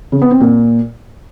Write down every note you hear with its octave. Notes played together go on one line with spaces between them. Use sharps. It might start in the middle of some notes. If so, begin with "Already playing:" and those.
C#3
B3
C4
A#2